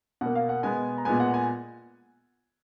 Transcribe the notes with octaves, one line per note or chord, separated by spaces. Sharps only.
B2 A#3 F#5
F5
F#5
B2 G#3 B3 G#5
A#5
A#2 G#3 B3 G#5
F#5
G#5